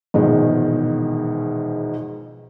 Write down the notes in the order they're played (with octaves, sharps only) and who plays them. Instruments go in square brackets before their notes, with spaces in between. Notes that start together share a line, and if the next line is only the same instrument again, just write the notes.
[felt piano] A#1 E2 G#2 B2 D#3 G#3